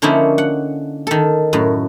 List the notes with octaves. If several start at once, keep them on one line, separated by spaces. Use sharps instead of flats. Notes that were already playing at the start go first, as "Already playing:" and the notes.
D3 F3 A#3 C#4 D#4 E4
F#5
D#3 A4
F#2 A2